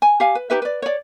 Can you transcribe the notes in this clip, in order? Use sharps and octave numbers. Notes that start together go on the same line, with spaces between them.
G#5
G4 F5 G#5
B4
D#4 G4 B4 E5
B4 D5
C#5 D5